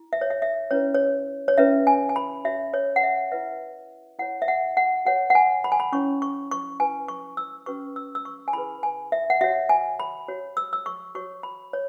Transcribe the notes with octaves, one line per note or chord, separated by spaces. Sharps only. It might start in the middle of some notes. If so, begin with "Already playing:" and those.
Already playing: E4
E5
C#5
E5
E5
C#4 E4 B4 C#5
C#5
C#5
C#4 E4 B4 E5
G#5
G#5
B5
F#4 C#5 E5
C#5
F#5
E5
E4 B4 E5
E4 C#5 F#5
E5
F#5
F#5
F#4 C#5 F#5
F#5
G#5
B5
G#5
B5
C#4 E4 C#5 C#6
C#6
C#6
E4 B4 G#5
C#6
E6
C#4 F#4 B4 C#6
E6
E6
C#6
G#5
E4 G#4 B4 B5
G#5
E5
F#5
F#4 C#5 E5
G#5
B5
F#4 C#5
E6
E6
C#6
F#4 C#5 C#6
B5
C#5